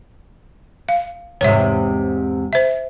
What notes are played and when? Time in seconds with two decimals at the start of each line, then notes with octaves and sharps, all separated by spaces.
0.89 F5
1.41 E2 G#2 C3 C#5 E5
2.53 C5 E5